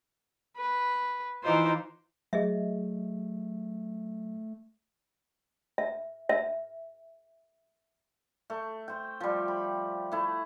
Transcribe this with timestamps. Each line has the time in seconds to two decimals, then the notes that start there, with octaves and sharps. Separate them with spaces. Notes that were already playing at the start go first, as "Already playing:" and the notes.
0.57 B4
1.43 E3 D#4 F4 C5 D6
2.33 F#3 A3 G#4 D#5 E5
5.78 E5
6.29 E5
8.50 A3
8.88 C5 G5
9.20 F3 G3
9.48 B5
10.12 A3 E4